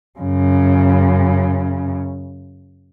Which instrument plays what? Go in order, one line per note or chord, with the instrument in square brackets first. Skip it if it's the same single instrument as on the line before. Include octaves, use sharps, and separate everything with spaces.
[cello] F#2 C#3